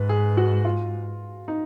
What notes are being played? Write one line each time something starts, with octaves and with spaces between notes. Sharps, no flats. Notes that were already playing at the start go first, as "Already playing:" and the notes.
Already playing: G#2 B4
G#4
F#4
F4
D#4